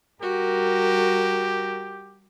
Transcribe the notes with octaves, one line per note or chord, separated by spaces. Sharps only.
G3 F#4 G4 A#4